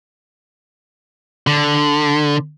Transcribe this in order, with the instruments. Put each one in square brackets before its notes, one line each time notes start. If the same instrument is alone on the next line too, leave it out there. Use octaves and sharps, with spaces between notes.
[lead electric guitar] D3